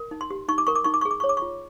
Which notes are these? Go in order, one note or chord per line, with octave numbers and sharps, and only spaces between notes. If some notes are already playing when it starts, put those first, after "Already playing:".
Already playing: A#4
D#4
C6
G4
D#4 C#6
D6
A#4 C#6
D6
D#4 C#6
D6
C#6
G#4
D6
C#5 C#6
D6
F4 C#6